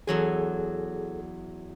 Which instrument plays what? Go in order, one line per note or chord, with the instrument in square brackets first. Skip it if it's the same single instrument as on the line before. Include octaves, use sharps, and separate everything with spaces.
[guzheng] E2 F#3 G#5 [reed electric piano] G#4 A4